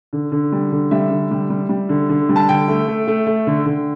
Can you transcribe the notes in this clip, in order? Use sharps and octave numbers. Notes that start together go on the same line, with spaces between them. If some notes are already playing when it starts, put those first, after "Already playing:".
D3
D3
G3
D3
G3 E5
D3
G3
G3
G3
D3
D3
G3
A5
D3 G5
A3
A3
A3
A3
D3
D3